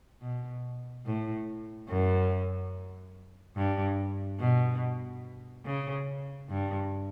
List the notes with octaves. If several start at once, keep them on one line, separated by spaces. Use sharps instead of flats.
B2
A2
F#2
G2
B2
C#3
G2